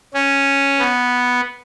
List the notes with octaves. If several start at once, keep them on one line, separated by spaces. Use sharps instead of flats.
C#4
B3